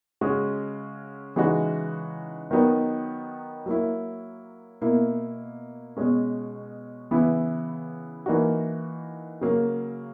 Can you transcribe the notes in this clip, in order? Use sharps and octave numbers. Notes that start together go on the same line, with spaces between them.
C#3 G#3 C#4 F#4
C#3 E3 G#3 D#4 F#4
D#3 F#3 B3 D#4
F#3 A#3 E4
B2 A#3 E4
B2 G#3 C#4
C#3 E3 B3 E4
E3 A#3 D#4 F#4
C#3 F#3 A#3